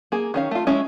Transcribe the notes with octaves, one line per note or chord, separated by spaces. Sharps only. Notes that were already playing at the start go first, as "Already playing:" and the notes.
A#3 G#4
D#3 C#4 F5
A3 F4
G#3 C#4 E4